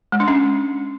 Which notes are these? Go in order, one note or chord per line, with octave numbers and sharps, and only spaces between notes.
G#3
D4
C#4